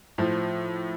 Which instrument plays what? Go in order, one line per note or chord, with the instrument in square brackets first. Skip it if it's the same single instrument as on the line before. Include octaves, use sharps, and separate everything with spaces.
[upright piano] A2 [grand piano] F3